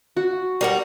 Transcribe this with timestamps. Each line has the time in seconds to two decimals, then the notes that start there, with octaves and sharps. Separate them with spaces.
0.17 F#4
0.61 G3 A#4 F#5